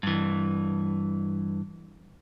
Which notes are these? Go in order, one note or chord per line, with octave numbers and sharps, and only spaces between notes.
G2 E3